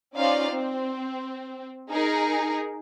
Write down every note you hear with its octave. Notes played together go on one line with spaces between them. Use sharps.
C#4 D#4 F4 C5 D5 F5
C4
D#4 G#4 A#4